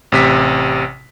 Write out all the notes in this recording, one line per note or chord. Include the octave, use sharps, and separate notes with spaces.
A1 C3 B6